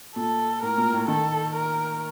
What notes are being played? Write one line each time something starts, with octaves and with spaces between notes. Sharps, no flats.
A#2 A4
A2 A#4
A#2
A2
D#3 A4
A#4